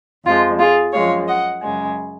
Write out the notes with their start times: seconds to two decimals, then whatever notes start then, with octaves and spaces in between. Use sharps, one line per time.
0.25 F2 F3 G#3 F4
0.59 F4 G#4
0.93 F#2 F3 G#3 C#5 F5
1.27 D#5 F#5
1.62 F#2 C#3 G#3